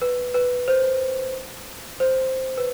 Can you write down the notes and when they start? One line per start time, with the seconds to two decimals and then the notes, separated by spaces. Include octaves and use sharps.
0.02 B4
0.34 B4
0.68 C5
2.00 C5
2.58 B4